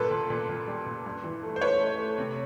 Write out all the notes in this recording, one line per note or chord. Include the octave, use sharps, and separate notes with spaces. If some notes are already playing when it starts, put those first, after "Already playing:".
Already playing: G2 A#2 A4 B4
A#2
A#2
A#2
G3
A#2
G2
E3
A3
C5
A3 B4 C#5
A3
A3
C3